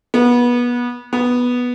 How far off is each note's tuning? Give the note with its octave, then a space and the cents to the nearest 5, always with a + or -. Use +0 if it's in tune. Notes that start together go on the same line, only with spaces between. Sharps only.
B3 -25
B3 -5